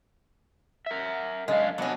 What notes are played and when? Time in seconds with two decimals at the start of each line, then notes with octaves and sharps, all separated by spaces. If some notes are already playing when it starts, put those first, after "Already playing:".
0.86 A#4 E5
1.48 F#2 G#3 D4 F5
1.78 F#3 B3 C#4 D4 D#5